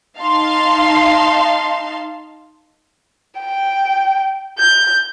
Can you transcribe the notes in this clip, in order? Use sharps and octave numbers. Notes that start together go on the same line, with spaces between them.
D#4 F5 A5 C6
G5
G6